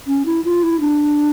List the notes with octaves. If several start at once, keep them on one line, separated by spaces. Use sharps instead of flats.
C#4
E4
F4
E4
D4